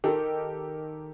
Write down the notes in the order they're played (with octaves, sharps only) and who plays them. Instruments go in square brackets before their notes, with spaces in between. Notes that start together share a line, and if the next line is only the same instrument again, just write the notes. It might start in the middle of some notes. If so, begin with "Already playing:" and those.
[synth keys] D#3 [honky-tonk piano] G4 A4 A#4